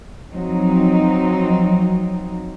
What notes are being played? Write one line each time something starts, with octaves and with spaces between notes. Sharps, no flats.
F3 F#3 C4 D#4